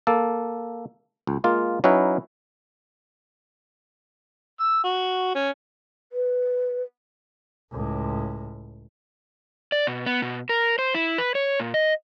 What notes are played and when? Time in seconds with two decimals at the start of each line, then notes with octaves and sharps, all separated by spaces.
0.07 A#3 A4
1.27 C#2
1.44 G#3 A#3 F4
1.84 F#3 C#4 D#4 E4 B4
4.60 E6
4.84 F#4
5.35 C#4
6.12 B4
7.72 C#2 A2
9.72 D5
9.87 B2
10.06 B3
10.22 B2
10.49 A#4
10.79 C5
10.95 E4
11.18 B4
11.35 C#5
11.60 A#2
11.74 D#5